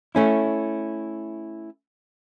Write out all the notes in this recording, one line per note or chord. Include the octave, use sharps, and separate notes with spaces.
A3 C#4 E4